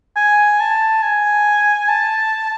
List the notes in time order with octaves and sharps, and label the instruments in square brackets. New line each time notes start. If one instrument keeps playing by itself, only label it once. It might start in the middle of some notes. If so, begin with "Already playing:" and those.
[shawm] G#5
A5
G#5
A5